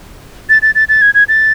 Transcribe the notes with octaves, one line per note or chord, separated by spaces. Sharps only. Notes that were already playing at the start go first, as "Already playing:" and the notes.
A6
A6
A6
A6
G#6
G#6
A6